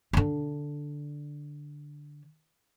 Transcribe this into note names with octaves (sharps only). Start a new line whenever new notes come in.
D3 D4